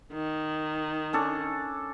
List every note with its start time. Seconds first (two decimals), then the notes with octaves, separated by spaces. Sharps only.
0.13 D#3
1.13 C#4 D4 A4